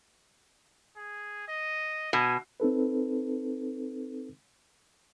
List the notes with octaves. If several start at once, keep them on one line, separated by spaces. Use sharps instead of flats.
G#4
D#5
B2 G#5
C4 D#4 A4 B4